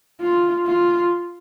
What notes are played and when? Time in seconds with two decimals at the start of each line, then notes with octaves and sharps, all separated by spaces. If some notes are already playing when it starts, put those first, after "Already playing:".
0.21 F4
0.66 F4